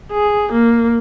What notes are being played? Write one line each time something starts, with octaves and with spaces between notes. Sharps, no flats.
G#4
A#3